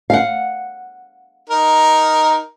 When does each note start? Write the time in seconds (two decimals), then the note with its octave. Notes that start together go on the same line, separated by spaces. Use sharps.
0.10 F5 F#5
1.50 D#4 A#4